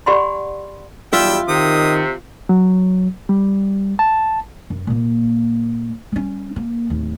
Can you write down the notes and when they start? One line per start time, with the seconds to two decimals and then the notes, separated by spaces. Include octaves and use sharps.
0.06 G4 D5 F#5 G#5 B5 C6
1.13 B1 E2 G3 F4 E5 G5 E6
1.48 C3 D#3 D#6
2.49 F#3
3.29 G3
3.99 A5
4.70 F#2
4.87 A#2 A#3
6.12 G3 C#4
6.56 A#3
6.90 D1 D#2